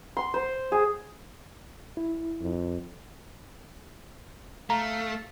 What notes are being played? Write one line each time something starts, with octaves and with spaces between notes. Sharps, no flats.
C6
C5
G#4
E4
F2
A3 F5 A#5